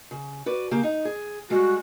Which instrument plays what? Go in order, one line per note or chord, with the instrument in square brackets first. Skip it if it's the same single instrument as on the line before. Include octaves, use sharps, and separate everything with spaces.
[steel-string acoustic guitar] C#3
F#4 B4 D5
C#3 A#3 G4
D#4
G#4
[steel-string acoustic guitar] G3 G#3 [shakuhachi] F#4